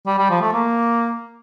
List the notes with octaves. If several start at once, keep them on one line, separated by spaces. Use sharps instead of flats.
G3
G3
F3
A3
A#3